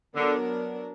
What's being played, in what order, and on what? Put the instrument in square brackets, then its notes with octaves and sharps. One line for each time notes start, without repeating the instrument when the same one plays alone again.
[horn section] D3 [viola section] F#3 B3 D4 A#4